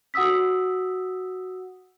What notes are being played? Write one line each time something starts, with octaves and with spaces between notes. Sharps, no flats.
F#4 F#5 D#6 E6 B6